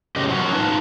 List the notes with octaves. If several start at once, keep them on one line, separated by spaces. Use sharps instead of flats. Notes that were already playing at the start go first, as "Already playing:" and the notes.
F#2 A2 C#3 G4 D#5
F3 F#3 C#4 F#4
D#4 F4 B4 A5